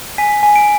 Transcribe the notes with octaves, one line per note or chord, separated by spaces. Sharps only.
G#5 B6
G#5
D7